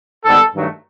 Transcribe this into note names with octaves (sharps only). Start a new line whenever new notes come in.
G#2 D#3 G3 B3 A4
G2 D#3 F#3 A3